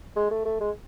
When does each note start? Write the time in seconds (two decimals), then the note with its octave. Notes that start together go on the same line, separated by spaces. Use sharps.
0.16 G#3
0.31 A3
0.45 A3
0.60 G#3